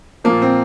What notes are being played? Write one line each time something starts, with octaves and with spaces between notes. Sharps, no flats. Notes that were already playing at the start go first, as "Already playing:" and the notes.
F3 A#3
A#2
C4